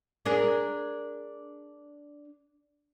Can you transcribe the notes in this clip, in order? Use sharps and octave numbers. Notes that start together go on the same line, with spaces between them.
D4 G#4 A#4